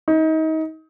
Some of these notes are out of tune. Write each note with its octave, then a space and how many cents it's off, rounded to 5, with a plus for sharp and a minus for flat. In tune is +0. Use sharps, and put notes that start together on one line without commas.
D#4 +30